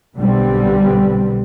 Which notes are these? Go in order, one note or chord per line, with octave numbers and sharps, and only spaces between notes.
B1 B2 D3 G3 B3 C4